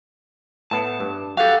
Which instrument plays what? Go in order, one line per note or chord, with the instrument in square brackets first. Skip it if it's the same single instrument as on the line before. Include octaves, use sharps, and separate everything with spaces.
[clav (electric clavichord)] A2 B3 [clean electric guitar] A5
[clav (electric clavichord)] G2
[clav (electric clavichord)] F#4 G4 [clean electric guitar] A4 F5